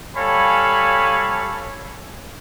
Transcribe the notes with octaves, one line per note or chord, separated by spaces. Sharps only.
G3 A4 C#5 F5 G#5 B5